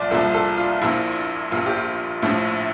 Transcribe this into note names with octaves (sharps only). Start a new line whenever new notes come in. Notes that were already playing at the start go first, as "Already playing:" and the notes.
Already playing: C2 A#2 F3 D5
C2 A#2 F3 A4
A4
F4
A#1 A#2 F3 E4
A#1 A#2 F3 F4
G4
F4
A#1 A2 F3